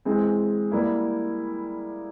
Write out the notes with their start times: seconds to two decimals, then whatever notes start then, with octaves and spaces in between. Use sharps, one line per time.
0.05 E3 G#3 C4
0.72 G3 A#3 E4